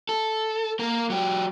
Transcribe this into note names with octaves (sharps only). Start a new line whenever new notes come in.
A4
A#3 A#4
F#3 G4